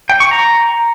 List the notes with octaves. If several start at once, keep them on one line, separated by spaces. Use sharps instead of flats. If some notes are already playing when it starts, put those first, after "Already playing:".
G5
C#6
A#5